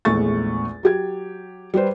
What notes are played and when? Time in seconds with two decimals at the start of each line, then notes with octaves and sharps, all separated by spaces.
0.05 A#1 E2 G#3 A3 C#6 A6
0.83 F#3 G4 G#6
1.74 G3 G4 B4 C5